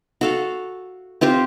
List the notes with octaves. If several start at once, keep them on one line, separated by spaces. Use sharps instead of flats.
F#4 A4 F5
C4 F4 G4 C5